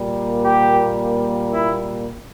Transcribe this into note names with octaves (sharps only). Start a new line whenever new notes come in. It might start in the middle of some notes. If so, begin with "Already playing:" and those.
Already playing: A#2 G3 A#3
G4
E4